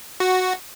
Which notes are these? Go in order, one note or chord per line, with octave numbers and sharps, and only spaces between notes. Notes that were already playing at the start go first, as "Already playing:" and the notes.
F#4